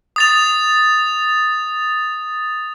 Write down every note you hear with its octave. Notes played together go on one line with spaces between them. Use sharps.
D#6 A6 F7